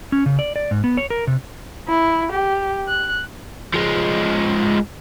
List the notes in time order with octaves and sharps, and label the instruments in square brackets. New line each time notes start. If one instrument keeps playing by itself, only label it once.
[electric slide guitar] C#4
C#3
D5
D5
G#2
B3
C#5
A#4
C3
[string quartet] E4
G4
F#6
[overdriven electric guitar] F3 G#3